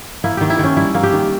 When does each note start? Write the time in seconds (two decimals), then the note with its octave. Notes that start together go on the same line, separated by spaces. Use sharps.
0.24 A#3 E4
0.37 D#3 G4
0.50 E4
0.59 D#3 C#4
0.77 G3 E4
0.95 A#3
1.03 G4
1.13 D#3